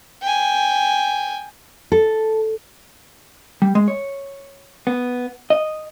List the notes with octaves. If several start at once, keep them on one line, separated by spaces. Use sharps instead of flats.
G5 G#5
A4
G3
G#3
C#5
B3
D#5